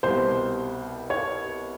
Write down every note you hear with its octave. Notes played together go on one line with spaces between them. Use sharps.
C2 B2 G3 C5
C#5